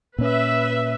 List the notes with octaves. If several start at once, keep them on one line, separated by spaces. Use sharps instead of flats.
A#2 C#4 B4 E5